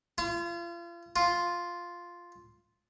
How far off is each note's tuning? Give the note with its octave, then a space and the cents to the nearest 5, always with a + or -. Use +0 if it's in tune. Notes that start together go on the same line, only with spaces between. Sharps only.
F4 -35
F4 +0